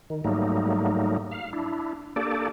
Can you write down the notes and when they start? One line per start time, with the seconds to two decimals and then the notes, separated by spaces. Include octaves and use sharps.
0.10 D#3
0.24 G#2 F#3 G3 A3 A#3 D#4
1.31 F5
1.53 D4 E4
2.16 A#3 D4 G4 A4 D5